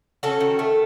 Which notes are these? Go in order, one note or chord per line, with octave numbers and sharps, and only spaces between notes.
C#4 F#4 A4
D#3
A3